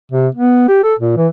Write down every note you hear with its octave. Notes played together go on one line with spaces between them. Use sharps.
C3
B3
G4
A4
A#2
E3